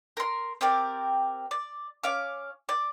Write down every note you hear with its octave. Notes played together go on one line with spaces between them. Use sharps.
A#4 C6
C4 G4 A#4 D5
D5
C#4 F5 D6
D5